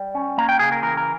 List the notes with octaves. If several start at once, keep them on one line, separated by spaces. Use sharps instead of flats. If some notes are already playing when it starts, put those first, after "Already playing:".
Already playing: G3
C#4
A#3 A#5
G5
C#3 G#4
A#4
E3 A#4
A#4